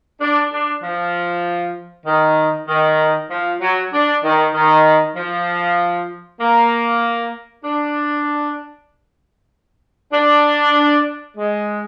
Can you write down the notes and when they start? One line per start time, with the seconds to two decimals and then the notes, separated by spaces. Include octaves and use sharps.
0.21 D4
0.52 D4
0.83 F3
2.06 D#3
2.68 D#3
3.30 F3
3.61 F#3
3.93 D4
4.24 D#3
4.54 D#3
5.16 F3
6.41 A#3
7.65 D4
10.13 D4
11.37 G#3